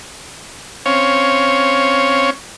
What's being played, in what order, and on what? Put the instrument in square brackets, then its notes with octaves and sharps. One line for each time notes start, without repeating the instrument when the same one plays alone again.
[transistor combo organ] C4 C#4 C#5 F5